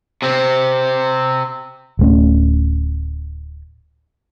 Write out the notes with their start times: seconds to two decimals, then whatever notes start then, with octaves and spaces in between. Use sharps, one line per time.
0.22 C3 C4
1.99 D1 A3 C#4